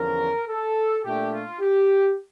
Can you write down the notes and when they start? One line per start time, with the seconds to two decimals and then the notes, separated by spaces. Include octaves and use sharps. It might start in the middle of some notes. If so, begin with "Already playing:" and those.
Already playing: E2 D3 F3 C#4 A#4
0.48 A4
1.04 A#2 A3 D4 G4
1.32 F4
1.60 G4